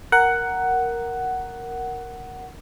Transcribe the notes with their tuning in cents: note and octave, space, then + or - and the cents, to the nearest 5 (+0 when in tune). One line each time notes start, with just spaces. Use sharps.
A#4 +0 F#5 +10